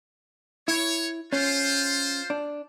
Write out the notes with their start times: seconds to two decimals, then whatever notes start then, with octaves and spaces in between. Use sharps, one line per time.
0.68 E4 C#5
1.33 C#4 F4 C5
2.30 D4